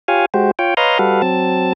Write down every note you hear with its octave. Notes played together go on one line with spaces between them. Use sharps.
F4 G4 C#5 F5 G#5
G#3 F#4 G4 C5
F4 C#5 G5
B4 C#5 D#5 F5 A#5 C6
G3 F#4 A4 B4 F5
F#3 C4 A5